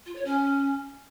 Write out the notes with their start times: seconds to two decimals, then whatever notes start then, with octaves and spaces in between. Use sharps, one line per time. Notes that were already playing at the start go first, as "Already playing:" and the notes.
0.06 F4
0.15 C#5
0.25 C#4